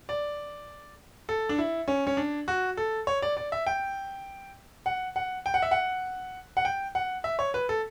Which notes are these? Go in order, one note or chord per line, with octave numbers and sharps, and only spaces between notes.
D5
A4
D4
E4
C#4
C#4
D4
F#4
A4
C#5
D5
D5
E5
G5
F#5
F#5
G5
F#5
E5
F#5
F#5
G5
F#5
E5
C#5
B4
A4